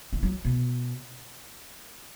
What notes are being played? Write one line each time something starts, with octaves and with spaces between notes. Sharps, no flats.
D#3
F#3
B2